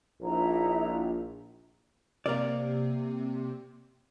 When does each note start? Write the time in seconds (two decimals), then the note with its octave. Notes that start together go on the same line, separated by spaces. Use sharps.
0.22 A#1 D#4 E4 A#5
2.26 C3 A#3 A#4 D5